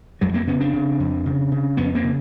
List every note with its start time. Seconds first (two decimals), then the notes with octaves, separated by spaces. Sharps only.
0.21 F2 F#3 G#3
0.34 A#3 C4
0.47 C#3 B3 C#4
0.60 C4 D4
0.74 C#3
1.00 F2
1.26 C#3
1.52 C#3
1.77 F2 B3 C#4
1.95 A#3 C4
2.04 C#3